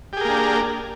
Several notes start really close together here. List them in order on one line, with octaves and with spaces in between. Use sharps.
G4 G#4 A#4 A#3 D4